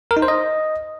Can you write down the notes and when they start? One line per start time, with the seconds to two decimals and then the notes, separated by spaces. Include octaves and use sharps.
0.11 A#4
0.17 D#4
0.22 C5
0.28 D#5